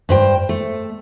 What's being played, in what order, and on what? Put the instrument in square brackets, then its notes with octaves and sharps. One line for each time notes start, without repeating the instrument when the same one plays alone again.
[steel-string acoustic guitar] G2 C5 G5
A3